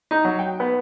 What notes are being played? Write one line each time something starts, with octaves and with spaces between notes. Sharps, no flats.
D#4
F#3
G5
B3